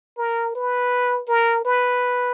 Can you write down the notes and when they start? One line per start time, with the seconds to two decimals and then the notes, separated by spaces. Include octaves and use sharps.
0.18 A#4
0.55 B4
1.28 A#4
1.65 B4